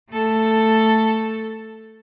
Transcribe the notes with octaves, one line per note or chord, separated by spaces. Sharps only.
A3 A4